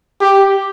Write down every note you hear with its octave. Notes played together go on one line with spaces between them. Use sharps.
G4